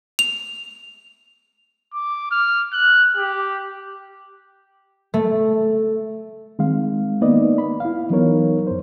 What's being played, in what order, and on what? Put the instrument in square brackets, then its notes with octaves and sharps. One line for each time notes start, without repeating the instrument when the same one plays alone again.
[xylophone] F7
[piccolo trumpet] D6
F6
F#6
G4
[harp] A3
[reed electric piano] D#3 G#3 C4 F5
A#3 B3 D#4 B4 D5 D#5
B5
E4 F5
E3 F#3 B3 D#4 A#4 C#5
F#2 C5